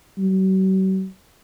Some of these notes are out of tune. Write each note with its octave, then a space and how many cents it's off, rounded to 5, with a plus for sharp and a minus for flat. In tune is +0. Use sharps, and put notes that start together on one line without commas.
F#3 +45